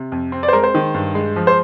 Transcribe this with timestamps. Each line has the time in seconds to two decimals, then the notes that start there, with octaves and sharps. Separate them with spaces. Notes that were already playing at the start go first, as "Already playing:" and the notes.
Already playing: C3
0.12 F2
0.32 C4
0.43 D5
0.48 C5
0.53 G#3 A#4
0.63 C5
0.75 D#3
0.94 G2
1.15 G#3
1.36 F3
1.47 C5